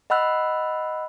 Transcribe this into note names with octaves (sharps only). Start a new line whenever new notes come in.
D#5 F#5 B5 E6 F#6